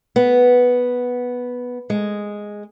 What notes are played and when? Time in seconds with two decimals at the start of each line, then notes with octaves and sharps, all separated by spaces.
0.16 B3
1.90 G#3